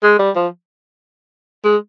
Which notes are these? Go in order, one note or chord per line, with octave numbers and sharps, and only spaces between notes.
G#3
G3
F3
G#3